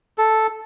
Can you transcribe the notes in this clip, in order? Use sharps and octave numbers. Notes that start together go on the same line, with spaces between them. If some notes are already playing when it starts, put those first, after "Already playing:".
A4